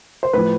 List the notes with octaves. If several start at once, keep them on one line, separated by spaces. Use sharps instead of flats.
C5
A2 F3 B4